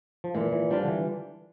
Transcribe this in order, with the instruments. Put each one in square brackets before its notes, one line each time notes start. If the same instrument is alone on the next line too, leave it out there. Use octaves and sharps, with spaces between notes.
[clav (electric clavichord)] F3
[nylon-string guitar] A#2 [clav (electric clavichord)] E3
[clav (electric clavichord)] E3
[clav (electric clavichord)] F3 [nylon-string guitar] G3 D4 F4
[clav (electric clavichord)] D3
E3